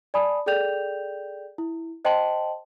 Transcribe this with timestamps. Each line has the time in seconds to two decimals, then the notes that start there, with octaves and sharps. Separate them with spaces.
0.14 D5 G#5 A5 B5 D#6
0.46 G#4 A4 D5 G5 G6 F7
1.58 E4
2.05 C5 D#5 G5 A5 C6 F#7